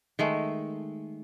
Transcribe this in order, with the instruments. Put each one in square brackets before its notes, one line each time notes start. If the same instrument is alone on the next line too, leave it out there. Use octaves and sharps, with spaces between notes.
[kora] D#3 G#3 A3